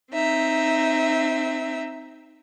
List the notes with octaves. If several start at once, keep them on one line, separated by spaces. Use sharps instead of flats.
C4 D#4 E5